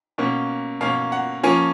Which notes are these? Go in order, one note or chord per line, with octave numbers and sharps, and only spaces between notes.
B2 A#3 C#4
B2 A#3 C#4 F5
F#5
F3 A#3 C#4 G#5